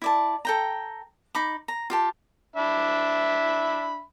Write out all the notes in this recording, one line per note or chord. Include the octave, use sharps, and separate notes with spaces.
E4 D5 A5
A4 G5 A#5
D#4 B5 D6
A#5
F4 G4 A5
D4 E5 B5